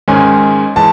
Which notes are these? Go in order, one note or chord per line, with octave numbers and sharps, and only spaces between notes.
G#2 D#3 G#3 C#4 G#5
E3 G#3 A5